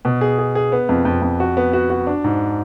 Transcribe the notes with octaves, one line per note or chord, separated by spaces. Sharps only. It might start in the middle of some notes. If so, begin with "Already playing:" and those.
B2
G#4
G#4
G#4
B3
F2
F2
F2
F#4
B3
F#4
F#4
D4
G#2